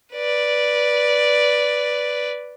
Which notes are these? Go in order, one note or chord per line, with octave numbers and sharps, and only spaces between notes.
B4 D5